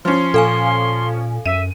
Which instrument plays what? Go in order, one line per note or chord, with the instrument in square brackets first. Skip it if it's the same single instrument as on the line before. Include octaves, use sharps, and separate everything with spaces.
[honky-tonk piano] F3 C#4 [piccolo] C6
[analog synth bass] A#2 [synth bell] A4 F5 G#5
[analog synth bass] F#2 [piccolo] E5 [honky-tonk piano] D#7